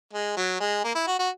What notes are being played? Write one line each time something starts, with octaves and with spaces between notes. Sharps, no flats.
G#3
F#3
G#3
A#3
E4
F#4
F#4